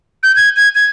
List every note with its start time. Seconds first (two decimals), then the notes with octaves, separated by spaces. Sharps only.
0.23 G6
0.36 G#6
0.56 G#6
0.75 G#6